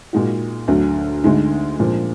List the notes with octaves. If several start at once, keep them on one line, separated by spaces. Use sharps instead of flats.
A#2 G#3 D#4 F#4
D2 D3 F#3
D2 D3 G#3 D#4
A#2 F3 G#3 D4